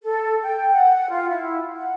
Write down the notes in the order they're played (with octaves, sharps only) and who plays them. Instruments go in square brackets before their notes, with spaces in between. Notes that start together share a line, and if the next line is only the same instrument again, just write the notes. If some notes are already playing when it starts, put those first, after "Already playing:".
[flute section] A4
G5
F#5
F4
E4
F#5